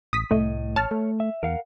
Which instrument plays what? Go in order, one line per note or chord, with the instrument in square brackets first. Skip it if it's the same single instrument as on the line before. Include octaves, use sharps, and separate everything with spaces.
[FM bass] A1 [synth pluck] D#6 B6
[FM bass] C2 [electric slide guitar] A2 D#5 [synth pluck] A3
[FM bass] A1 [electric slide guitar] C#5 [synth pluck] A5 F6
[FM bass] A3
[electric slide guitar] E5
[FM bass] E2 [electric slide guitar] A#4 F5 F#5